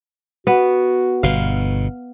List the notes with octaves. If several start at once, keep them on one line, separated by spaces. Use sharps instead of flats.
B3 F#4
G1 B2 F5